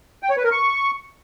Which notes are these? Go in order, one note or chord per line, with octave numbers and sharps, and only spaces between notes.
G5
C#5
B4
A#4
C#6